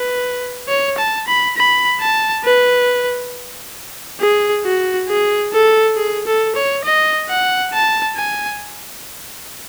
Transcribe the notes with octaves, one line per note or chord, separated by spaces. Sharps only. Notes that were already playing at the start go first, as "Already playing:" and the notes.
Already playing: B4
C#5
A5
B5
B5
A5
B4
G#4
F#4
G#4
A4
G#4
A4
C#5
D#5
F#5
A5
G#5